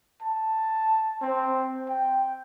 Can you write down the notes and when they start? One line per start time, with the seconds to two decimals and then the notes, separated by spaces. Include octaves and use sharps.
0.22 A5
1.22 C4
1.89 G5